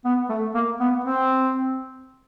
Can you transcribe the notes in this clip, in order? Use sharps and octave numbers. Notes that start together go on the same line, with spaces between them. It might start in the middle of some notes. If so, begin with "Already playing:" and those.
B3
A3
A#3
B3
C4